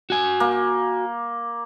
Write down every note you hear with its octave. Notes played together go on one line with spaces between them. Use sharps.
F#4 G#5
A#3